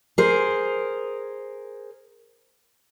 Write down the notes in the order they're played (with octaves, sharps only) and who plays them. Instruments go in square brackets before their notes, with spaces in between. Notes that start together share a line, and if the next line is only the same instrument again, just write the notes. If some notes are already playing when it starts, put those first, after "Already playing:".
[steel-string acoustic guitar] G#4 A#4 C5